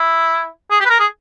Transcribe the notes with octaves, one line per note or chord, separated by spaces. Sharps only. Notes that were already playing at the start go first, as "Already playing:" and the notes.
Already playing: E4
G#4
G4
B4
A#4
G#4